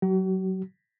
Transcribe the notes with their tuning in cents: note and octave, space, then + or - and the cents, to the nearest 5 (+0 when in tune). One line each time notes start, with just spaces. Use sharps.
F#3 +20 F#4 +45